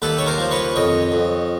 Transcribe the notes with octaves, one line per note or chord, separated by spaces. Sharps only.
D#2 A4 B4
C#5
A#4 C5
F3
B4 C#5
F2 C#5 D#5
F2